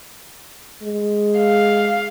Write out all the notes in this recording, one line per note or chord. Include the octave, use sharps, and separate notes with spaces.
G#3
F5